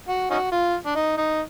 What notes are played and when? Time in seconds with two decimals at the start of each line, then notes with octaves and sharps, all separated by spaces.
0.09 F#4
0.31 C#4 D#4 F#4
0.52 F4
0.86 D4
0.95 D#4
1.18 D#4